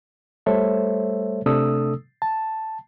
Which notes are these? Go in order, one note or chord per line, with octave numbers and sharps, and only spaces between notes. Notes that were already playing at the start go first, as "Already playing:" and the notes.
G3 A3 A4 C5 C#5 E5
C3 A3 D4 A4 D#6 E6
A5